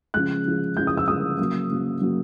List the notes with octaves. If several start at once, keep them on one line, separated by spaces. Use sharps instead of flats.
C#3 F3 G#3 F#6
C#3 F3 G#3
C#3 F3 G#3 G6
D#6
E6
C#3 F3 G#3 D#6
C#3 F#3 A#3
C#3 F#3 A#3
C#3 F#3 A#3